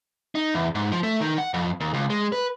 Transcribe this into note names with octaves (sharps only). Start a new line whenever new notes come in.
D#4
E2
G#2
F3
A3
D#3
F#5
F2
D#2
C#2
G#3
B4